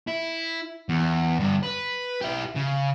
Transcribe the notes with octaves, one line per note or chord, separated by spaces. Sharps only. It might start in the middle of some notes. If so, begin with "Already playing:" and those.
E4
E2
G2 D3
B4
E4 G4
C#3